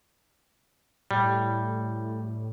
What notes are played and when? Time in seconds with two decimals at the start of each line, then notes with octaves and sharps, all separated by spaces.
1.11 A2 G3